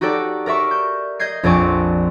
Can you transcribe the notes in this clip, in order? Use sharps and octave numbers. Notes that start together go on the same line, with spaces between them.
D#4 F#4 G4 A4 D5
A#4 D5 E5 C#6
G6
D#5 G6 G#6 C7
A#1 F2 C4 D5 G#5 C#6